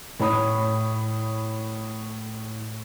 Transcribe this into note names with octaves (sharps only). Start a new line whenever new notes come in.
A2 C#5 B5 D#6